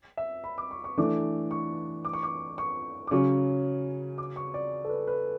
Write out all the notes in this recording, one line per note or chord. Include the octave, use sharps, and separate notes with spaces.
E5
B5
D6
C#6
C#6
E3 A3 D4 D6
C#6
D6
C#6
D6
C#6
D6
C#3 F#3 C#4 C#6
D6
C#6
D5
A4
B4
B4